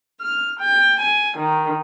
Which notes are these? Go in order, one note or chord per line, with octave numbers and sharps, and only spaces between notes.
F6
G5
G#5
D#3